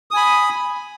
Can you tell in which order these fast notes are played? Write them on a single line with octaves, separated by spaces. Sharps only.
D#6 G#5 B5